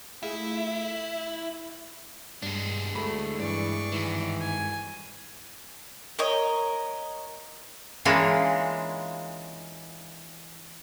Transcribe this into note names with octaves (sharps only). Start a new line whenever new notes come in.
A3 E4 F4 G#4
G2 G#3 D4
D2 A3 B5
G2 E3 D5 C#6
G#2 D#3 E3
G#5
A#4 C#5 D#5
E3 G#3 A#3 C#4 D4 F4